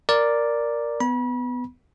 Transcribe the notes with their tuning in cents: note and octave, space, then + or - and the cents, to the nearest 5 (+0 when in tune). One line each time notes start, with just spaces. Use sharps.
A#4 +0 D5 +0
B3 +15 B5 -35